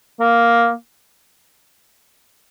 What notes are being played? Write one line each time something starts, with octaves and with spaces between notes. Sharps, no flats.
A#3